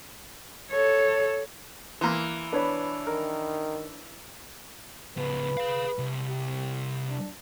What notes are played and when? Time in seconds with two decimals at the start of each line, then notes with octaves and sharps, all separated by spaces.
0.71 A4 C#5
2.01 E3 A#3 C6
2.53 B3 D4 C#5 B5
3.07 D#3 A#4
5.18 C#2 B3 B4
5.57 G#4 F5
5.98 C2
6.29 G4
7.09 D4